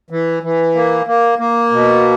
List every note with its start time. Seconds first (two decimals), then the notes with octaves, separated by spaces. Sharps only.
0.10 E3
0.43 E3
0.75 A#3
1.06 A#3
1.39 A#3
1.71 B2